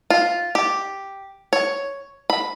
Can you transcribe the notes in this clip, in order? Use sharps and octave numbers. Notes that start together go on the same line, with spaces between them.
F4
G4
C#5
B5